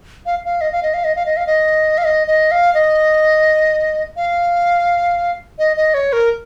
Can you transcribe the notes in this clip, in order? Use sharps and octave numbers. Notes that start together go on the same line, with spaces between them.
F5
F5
D#5
F5
D#5
F5
D#5
F5
D#5
F5
D#5
F5
D#5
D#5
F5
D#5
F5
D#5
D#5
C#5
A#4